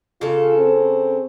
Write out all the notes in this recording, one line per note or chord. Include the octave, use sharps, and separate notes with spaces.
C#3 F4 A4
C4